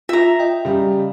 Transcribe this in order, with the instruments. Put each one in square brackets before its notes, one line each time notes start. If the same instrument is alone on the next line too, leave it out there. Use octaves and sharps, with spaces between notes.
[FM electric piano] F4 [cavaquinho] E5 A#5
[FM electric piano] D#5 G5
[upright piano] C#3 G3